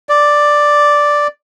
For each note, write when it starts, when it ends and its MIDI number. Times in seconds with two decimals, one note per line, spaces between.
0.09 1.27 74